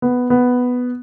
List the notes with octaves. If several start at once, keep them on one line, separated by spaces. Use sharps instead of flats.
B3
B3